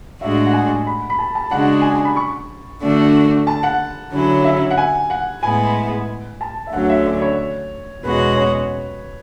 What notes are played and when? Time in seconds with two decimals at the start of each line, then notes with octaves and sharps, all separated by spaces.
0.21 A2 G#3 D4 F#4 E5
0.46 F#5
0.53 G#5
0.87 B5
1.10 B5
1.19 A5
1.35 A5
1.51 C#3 G#3 D4 F#4 F#5
1.82 G#5
1.94 A5
2.05 B5
2.16 C#6
2.82 D3 A3 D4 F#4
3.47 A5
3.63 F#5
4.12 D3 F#3 C#4 E4
4.44 E5
4.71 F#5
4.77 G#5
5.10 F#5
5.43 A2 G#3 B3 E4 G#5
6.41 A5
6.67 E5
6.73 D2 D3 F#3 C#4 F#5
6.89 E5
7.06 D5
7.22 C#5
8.03 E2 B2 G#3 C#4 F#4 B4
8.36 C#5